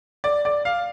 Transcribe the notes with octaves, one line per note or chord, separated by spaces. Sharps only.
D5
D5
F5